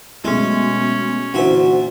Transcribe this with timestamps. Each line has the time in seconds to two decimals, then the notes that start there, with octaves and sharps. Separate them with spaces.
0.24 B2 F#3 G#3 A3 C#4
1.34 A#2 D3 E3 F#4 C5 E5